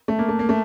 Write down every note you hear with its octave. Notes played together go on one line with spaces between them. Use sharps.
A3
A#3
A3
A#3
A3